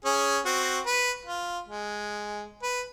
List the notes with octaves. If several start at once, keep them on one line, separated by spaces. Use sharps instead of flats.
C#4 G#4
C4 F#4
B4
F4
G#3
B4